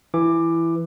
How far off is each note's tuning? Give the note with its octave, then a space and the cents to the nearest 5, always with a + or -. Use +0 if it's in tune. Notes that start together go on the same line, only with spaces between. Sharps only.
E3 +10 D6 +10